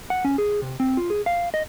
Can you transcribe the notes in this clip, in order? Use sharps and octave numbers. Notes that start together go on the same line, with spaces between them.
F#5
C#4
G#4
C3
C4
F4
G#4
F5
D#5